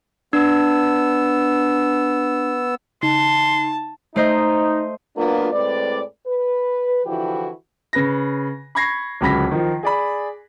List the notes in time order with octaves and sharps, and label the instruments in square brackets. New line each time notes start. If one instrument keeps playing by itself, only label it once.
[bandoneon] B3 E6 [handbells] D4
[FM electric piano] C#3 D#4 [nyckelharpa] A5 [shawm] C6
[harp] A3 C5 D#5 [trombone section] D#4
[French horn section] F#3 A#3 B3 D4 F4
A2 G#3 C4 B4 D5
B4
D3 E3 F3 E4 F#4 G4
[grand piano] C#3 B4 A#6
B5 C#6 G#6 A#6 C7
D1 C#2 C#3 B5 A#6 B6
D#3 F3
G#4 D5 B5